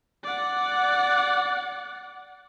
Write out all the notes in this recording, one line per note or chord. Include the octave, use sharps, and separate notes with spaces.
D5 F#5